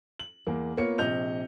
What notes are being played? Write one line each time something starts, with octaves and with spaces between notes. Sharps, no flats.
F#7
E2 A#3
A#3 B3 F4 C#5 C#7
A#1 C3 D#5 G6 F7